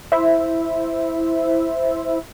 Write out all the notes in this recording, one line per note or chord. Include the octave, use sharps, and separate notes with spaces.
E4 C5 E5